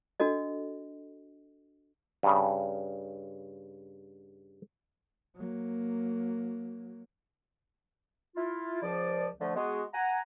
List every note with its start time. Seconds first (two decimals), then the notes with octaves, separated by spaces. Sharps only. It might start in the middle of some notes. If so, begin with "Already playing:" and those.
0.20 D4 F#4 A4 D#5
2.23 G2 C#3
5.36 F#3 A#3
8.36 E4 F4
8.83 C#2 F3 D5
9.39 D3 F3 A3
9.55 G#3 B3 F#4
9.93 F#5 G#5 A#5